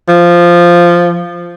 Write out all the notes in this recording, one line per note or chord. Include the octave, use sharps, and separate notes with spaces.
F3